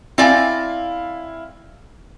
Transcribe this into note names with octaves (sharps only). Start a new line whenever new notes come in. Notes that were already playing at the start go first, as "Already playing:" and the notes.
C4 E4 D5 F5 G#5